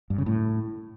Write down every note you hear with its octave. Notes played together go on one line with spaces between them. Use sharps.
G2
C#3
A2